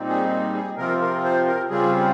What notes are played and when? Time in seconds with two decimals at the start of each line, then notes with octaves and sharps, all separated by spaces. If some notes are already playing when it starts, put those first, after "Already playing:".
Already playing: A#2 G3 C4 D#4
0.09 G#4
0.55 G#4
0.77 C3 F3 C4 F4 A#4
1.01 A#4
1.24 C5
1.47 A#4
1.70 C#3 G3 C4 F4 G#4